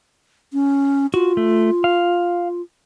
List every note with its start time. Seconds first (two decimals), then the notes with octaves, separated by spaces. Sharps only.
0.53 C#4
1.14 F4 F#4
1.37 A3
1.84 F5